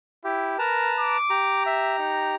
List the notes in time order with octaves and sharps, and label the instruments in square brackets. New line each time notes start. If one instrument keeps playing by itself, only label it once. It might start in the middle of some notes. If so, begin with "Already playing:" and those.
[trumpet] E4 [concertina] G4
[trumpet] A#4 [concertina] B4 A5 A#5
[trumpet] D6
[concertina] G4 A#5
[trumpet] E5
D#4